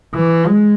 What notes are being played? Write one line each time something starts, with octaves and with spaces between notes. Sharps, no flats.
E3
G#3